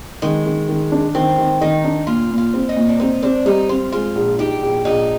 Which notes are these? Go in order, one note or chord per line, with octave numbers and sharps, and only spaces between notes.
D#3 G#3
D#3
D#3
D4
D#3 C4
D#3
D#3 D#4
D4
A#2 F4
A#2
F4
C4
D#4
A#2
D4
C4 D#4
C4 D4
G3 D#4
C4 F4
G#3 F4
A#1
D#4 G4
A#1
A#1 D#4